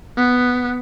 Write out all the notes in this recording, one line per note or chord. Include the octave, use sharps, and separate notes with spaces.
B3